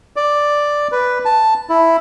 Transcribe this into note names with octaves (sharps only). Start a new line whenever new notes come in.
D5
B4
A5
E4